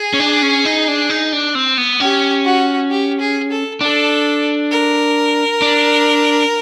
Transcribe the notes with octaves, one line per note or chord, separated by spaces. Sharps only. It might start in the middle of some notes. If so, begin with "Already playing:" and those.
Already playing: G#4
C#4
D4
C#4
D#4
D4
D#4
D4
C4
B3
C#4 G4
F#4
G4
G#4
A4
D4 A4
A#4
D4